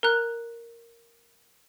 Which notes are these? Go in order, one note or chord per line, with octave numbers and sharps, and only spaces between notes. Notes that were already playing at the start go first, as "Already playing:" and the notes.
A#4 A#5 F#6